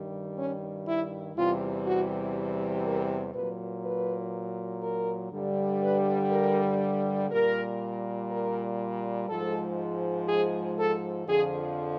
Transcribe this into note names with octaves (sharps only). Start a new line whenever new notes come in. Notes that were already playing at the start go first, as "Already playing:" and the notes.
Already playing: G2 D#3 G3
C#4
E4
E2 C3 E3 G3 F4
F#4
A#4
A#2 F#3 B4
B4
A#4
G2 D3 G3
B4
A#4
A#2 G3 A#4
A#4
G#2 F3 G#3 A4
G#4
A4
F2 D3 F3 G#4